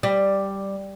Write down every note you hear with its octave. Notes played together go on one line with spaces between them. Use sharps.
G3